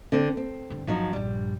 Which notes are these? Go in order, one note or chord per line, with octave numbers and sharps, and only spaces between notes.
D3 C4
C4
G2 D3
G1 F3 F#3 D#4
A#1 G2 G3